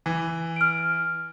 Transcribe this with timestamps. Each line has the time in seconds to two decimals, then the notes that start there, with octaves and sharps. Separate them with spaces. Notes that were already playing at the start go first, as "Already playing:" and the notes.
0.06 E3
0.56 F6 D7